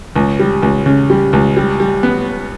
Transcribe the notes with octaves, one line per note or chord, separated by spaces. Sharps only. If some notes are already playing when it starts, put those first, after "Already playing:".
C#2
G3
C#2
C#3
G3
C#2
G3
G3
B3